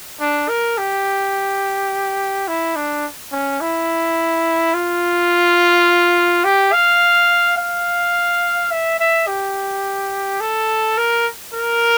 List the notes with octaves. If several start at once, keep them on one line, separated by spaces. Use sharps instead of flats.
D4
A#4
G4
E4
D4
C#4
E4
F4
G4
F5
F5
E5
E5
G4
A4
A#4
A#4